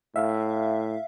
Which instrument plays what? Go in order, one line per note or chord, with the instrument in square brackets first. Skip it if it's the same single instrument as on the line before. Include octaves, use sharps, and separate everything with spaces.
[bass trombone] A2 [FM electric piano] E5 F5